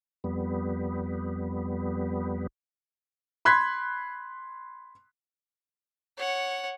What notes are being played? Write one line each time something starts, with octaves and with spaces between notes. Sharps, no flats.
F2 G3 B3
B5 C6 F#6 G#6 B6
C#5 F#5